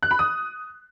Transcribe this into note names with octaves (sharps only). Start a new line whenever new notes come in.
F#6
B5
D#6